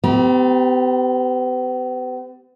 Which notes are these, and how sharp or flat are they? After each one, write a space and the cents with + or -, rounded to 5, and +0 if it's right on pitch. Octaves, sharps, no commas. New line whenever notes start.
B3 +45 G4 -10 A#5 +45